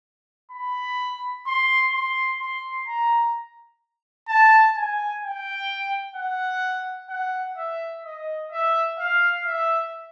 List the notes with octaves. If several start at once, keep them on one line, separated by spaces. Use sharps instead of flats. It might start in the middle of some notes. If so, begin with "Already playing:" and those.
B5
C6
C6
C6
A#5
A5
G#5
G5
F#5
F#5
E5
D#5
E5
F5
E5